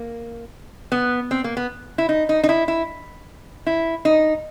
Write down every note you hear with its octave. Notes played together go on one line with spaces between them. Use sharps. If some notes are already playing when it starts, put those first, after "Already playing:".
Already playing: A#3
B3
C4
A#3
B3
E4
D#4
D#4
D#4
E4
E4
E4
D#4